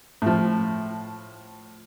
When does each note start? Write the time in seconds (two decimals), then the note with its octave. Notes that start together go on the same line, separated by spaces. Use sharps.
0.22 A2 F3